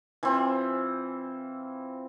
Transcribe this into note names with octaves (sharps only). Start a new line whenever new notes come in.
E3 C4 F4